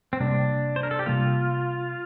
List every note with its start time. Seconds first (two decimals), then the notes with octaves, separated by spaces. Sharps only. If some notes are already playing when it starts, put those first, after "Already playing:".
0.13 C4
0.20 C3 G3 A#3 D4
0.76 C5
0.83 A#4
0.91 A4
0.99 G4
1.06 C3 G3 A#3 F4